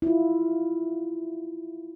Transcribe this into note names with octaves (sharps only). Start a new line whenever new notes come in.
E4 F4